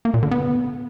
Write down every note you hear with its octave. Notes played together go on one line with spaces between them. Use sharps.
A#3
A#2
D3
B3